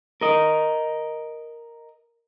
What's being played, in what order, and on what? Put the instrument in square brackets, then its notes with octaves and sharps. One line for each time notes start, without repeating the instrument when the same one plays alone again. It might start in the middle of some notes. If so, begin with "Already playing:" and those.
[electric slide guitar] A#4 D#5